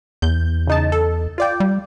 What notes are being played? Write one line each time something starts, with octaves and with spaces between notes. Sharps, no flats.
E2 G6
C#3 D#4 A5
A4
F4 D5 G5
G3